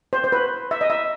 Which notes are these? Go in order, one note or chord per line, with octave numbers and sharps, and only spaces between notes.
C5
C5
B4
E5
D#5
E5